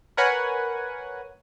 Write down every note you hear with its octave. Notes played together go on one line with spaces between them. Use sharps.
A#4 B4 C#5 F#5 G#5 B5